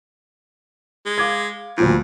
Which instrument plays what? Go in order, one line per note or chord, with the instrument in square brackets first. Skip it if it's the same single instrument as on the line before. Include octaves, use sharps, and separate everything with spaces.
[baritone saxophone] G#3
[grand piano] F5 D6 G#6
[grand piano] D2 A#2 F3 [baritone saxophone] G2